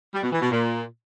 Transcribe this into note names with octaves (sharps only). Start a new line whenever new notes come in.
G3
B2
E3
B2
A#2